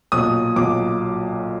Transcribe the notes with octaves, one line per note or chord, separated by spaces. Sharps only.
B1 A#2 F#3 D#6
B1 A#2 F#3 D6